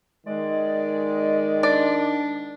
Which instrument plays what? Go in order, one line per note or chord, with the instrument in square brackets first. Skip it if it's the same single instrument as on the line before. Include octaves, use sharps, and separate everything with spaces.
[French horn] D#3 [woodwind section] G#3 [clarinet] D5
[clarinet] D4 [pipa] D5